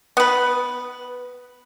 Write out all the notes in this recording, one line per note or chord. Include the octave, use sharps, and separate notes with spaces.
B3 B4